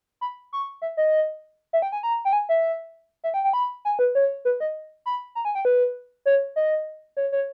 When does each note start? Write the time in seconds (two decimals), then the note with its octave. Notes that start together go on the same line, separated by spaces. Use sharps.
0.21 B5
0.53 C#6
0.82 E5
0.97 D#5
1.73 E5
1.82 G5
1.92 G#5
2.03 A#5
2.25 G5
2.33 G#5
2.49 E5
3.24 E5
3.34 G5
3.44 G5
3.53 B5
3.85 G#5
3.99 B4
4.15 C#5
4.45 B4
4.60 D#5
5.06 B5
5.35 A#5
5.45 G#5
5.55 G5
5.65 B4
6.26 C#5
6.56 D#5
7.17 C#5
7.32 C#5